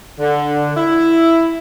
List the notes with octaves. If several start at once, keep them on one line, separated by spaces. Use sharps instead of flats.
D3
E4